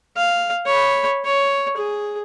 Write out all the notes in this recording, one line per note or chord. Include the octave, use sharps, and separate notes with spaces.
F5
C#5 B5
C#5
G#4